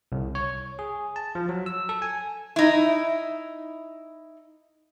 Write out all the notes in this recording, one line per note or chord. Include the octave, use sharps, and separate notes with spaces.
C2
C#5
G#4
A5
F3
F#3
E6
A4
G#5
D#4 E4